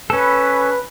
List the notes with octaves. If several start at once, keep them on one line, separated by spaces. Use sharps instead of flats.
C#4 A4 B4